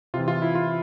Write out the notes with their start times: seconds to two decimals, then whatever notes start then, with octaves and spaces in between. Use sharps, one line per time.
0.14 C3 F4
0.18 E3
0.28 F4
0.42 E4
0.55 F4